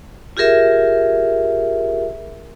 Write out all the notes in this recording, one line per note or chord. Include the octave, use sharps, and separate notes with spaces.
F4 G4 G#4 A#4 E5